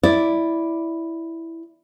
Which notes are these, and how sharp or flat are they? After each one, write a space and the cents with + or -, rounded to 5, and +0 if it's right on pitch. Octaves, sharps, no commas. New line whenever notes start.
E4 +0 D5 +0